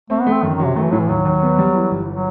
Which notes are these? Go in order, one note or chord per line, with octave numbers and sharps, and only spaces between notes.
A3 C4
B3
A3
C4
F#2 D#3
D#3
F#3
C3
D#3 A3
E3
A2 F#3
E3
D#2 F#3
D#2
B3
G3
E3
G1
F#3